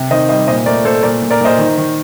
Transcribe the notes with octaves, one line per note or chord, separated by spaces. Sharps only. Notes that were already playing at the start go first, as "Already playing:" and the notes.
Already playing: C3
D#3 C5 D#5
G3 C5 D#5
A#2 C5 D#5
A3 A#4 D5
A3 A4 C5
A#2 A#4 D5
A#2
A#4 D5
A#2 C5 D#5
D#3
D#3